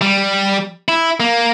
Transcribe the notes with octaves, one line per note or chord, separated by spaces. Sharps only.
G3
E4
A#3